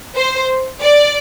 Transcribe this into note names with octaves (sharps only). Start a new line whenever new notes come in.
C5
D5